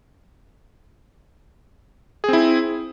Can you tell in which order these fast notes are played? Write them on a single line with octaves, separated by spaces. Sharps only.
G#4 C4 E4